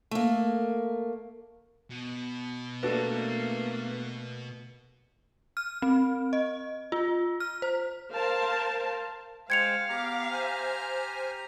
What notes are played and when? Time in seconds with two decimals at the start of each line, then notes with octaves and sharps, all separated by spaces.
0.11 A3 A#3
1.91 B2
2.83 A3 A#3 D4 F#4 A4 B4
5.57 F6
5.82 C4
6.33 D#5
6.92 F4
7.40 F6
7.62 C5
8.12 A#4 C5 F5 A5
9.50 G#3 C5 F5 G5 G#6 C#7 F7
9.89 B3 G4 A#5 D6
10.30 C5 G#5 F6